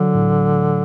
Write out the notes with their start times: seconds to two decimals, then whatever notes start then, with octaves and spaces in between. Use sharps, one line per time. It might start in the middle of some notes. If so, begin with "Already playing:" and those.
Already playing: D3 F#3
0.14 A2